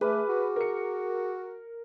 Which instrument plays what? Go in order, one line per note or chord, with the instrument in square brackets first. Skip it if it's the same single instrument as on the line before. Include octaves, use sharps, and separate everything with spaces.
[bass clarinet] A3 [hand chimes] G#4 D6 F6 [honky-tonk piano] B4
[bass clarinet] F#4
[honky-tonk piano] A#4 C#7